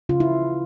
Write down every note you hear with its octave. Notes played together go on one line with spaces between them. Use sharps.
C#3 F4
E4